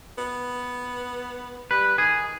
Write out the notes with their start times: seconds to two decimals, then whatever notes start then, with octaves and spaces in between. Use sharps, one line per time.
0.18 B3
1.71 G3 B4
1.98 D#3 G#4